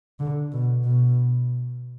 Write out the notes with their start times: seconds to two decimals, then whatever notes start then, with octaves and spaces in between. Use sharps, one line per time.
0.20 D3
0.52 B2
0.85 B2